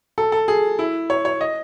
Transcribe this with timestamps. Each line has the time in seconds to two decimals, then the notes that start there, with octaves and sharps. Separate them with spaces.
0.18 A4
0.32 A4
0.48 G#4
0.79 E4
1.10 C#5
1.25 C#5
1.41 D#5